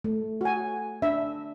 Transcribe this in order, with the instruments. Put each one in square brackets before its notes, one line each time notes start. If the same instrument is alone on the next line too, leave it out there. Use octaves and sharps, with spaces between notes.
[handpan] A3
[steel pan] F#4 G#5
[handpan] D4 [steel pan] E5